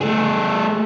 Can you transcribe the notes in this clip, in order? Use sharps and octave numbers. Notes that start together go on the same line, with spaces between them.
A3 G#4